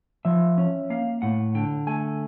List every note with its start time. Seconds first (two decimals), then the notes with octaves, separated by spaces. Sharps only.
0.25 F3 E5
0.58 C#4
0.90 A#3 F5
1.22 A2 F#5
1.55 D3 G5
1.87 A3 G#5